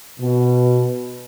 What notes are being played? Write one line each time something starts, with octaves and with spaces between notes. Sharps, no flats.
B2